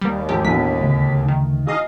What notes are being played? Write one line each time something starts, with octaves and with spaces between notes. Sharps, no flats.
D#2 G3 A#3
G#1 G4
A1 B2 A3 A#3 D4 G#5 B6
D2 C#3 A3
D#3
G#4 D#5 F5 D#6